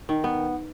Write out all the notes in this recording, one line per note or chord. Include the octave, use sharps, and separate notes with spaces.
D#3
B3